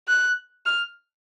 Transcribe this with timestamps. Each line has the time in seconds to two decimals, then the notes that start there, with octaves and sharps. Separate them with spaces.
0.08 F#6
0.66 F6